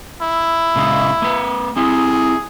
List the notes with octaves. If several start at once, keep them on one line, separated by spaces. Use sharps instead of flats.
E4
A#2 C#3 G#3
A#3 B4
C4 E4 G#4